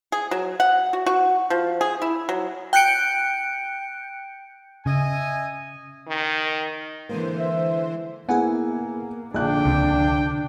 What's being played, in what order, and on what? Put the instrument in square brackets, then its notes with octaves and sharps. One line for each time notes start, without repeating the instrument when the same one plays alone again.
[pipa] G#4
F#3
F#5
F#4
F#4
F3
G#4
E4
F#3
[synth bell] G5 F#6 G6 C#7 D7
[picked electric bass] C#3 [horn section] D#5 E5 G#5
[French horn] D#3
[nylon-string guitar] D3 G#3 A#3 [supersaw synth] E3 C5
[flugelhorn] E5
[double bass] A#3 [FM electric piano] B3 E4 G#4 [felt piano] F#5 G#5
[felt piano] A#1 F#6 [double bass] D3 D4 [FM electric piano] G#4 [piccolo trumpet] G5
[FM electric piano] C#2 C3